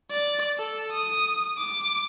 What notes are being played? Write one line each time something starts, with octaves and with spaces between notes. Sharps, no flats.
D5
A4
D#6
D6